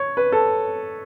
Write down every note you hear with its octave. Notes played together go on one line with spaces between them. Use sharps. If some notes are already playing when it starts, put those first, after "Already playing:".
Already playing: C#5
B4
A4